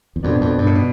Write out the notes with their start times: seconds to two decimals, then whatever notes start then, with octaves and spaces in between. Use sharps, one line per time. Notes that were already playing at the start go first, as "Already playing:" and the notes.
0.16 E2
0.23 F2 B2 B3 D4
0.41 F2
0.58 G2
0.66 A2
0.75 B2